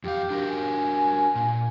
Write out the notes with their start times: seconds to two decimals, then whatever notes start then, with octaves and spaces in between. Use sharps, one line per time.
0.04 F2 G4 F5
0.30 D4 F#4 A#4
0.48 G#5
1.35 A#2